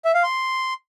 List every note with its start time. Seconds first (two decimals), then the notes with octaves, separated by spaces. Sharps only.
0.05 E5
0.14 F5
0.23 C6